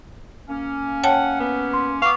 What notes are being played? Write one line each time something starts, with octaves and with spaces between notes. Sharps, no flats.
A#3 C#4
C#5 F#5 G5 A5
B3
C6
B3 F5 C#6 D6